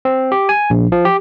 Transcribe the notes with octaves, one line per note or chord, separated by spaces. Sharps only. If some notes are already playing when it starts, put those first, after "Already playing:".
C4
G4
G#5
A#1
F3
G4